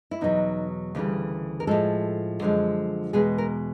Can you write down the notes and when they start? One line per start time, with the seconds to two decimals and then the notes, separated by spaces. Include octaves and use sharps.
0.11 E4
0.21 E2 B2 F#3 D#4
0.95 D2 C#3 E3 G3
1.60 A#4
1.67 A2 F3 G#3 A4
2.40 F#2 D3 F3 G#3
3.13 E2 B2 G#3 G#4
3.38 A#4